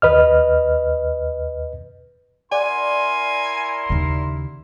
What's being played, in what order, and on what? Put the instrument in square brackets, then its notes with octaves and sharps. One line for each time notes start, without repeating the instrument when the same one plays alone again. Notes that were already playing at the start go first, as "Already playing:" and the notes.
[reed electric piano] D#2 B4 D#5 F6
[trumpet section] E4 A#4 C6 [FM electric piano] D5 F#5 [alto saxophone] G#5
[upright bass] D#2 C#3